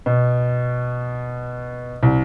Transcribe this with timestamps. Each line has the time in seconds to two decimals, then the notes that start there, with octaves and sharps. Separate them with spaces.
0.06 B2
2.03 C2